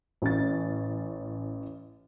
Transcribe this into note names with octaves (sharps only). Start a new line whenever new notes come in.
A1 C#4 A6